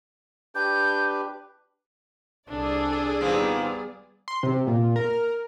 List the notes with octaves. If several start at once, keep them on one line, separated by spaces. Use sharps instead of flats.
D4 G4 B4 G6
C2 D4 G#4 A4 D5
A#2 D#3 G3 B3 C4
C6
C3
A#2
A#4